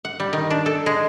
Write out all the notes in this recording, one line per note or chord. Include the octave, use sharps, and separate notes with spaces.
F#5
G3
D#3
D4
A4
G#3